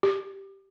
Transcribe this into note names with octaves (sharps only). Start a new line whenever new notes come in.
G4